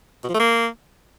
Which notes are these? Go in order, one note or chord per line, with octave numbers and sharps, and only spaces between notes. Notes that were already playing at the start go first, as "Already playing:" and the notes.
B2
F3
A3
A#3